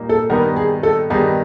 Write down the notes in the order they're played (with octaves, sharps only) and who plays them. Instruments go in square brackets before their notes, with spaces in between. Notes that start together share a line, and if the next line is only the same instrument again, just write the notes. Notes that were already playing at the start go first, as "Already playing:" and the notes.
Already playing: [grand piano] A#2 G3 A#3 D#4
[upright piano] A4
[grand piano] G2 D#3 G3 B3 D#4 [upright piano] A#4
[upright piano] G#4
A4
[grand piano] G2 D#3 G3 B3 D#4 [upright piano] G#4